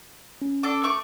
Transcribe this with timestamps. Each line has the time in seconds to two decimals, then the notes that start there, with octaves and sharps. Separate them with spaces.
0.42 C#4
0.63 D4 A4 D6
0.83 A3 C#6 D6